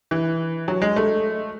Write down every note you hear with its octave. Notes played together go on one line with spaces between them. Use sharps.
E3
F#3
G#3
A3